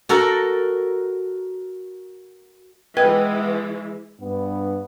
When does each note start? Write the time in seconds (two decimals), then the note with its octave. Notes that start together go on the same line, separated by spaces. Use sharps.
0.09 F#4 A4 A#4
2.97 E3 G#3 B3 B4 D#5 G5 G#6
4.21 G2 B3